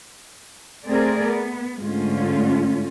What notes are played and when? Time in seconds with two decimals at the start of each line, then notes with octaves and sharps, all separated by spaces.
0.86 A3 C4 G#4 A#4 D5
1.24 B3
1.81 G#2 D3 G#3 A3 C#4 F4